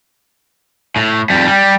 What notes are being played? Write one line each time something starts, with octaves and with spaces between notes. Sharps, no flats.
A2
F2 G3
G3